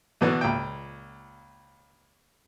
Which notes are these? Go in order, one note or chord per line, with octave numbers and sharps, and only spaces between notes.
B2 D3 E3 B3 D4 F#4
C#2 A#2 G5